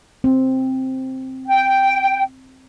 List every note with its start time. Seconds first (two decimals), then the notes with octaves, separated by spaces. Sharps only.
0.24 C4
1.46 G5